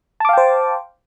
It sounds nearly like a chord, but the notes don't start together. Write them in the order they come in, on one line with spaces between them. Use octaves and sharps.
A5 D6 F5 G5 C5